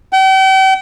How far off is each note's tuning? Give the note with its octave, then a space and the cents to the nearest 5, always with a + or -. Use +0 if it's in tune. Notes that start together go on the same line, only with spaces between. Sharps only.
G5 -40